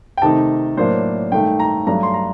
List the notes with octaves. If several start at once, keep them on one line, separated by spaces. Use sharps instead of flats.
G5
C3 D#3 A3 D#4 A5
A2 F#3 A#3 D4 C5
G2 D#3 A3 D#4 G5
A#5
G2 F#3 A3 D4 A#5
C6
A#5